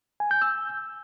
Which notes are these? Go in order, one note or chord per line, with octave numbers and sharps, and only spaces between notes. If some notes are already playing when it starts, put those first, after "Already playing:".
G#5
G6
E6